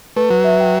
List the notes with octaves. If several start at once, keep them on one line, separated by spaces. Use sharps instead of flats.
A3 B4
F#3 B4
E5
G5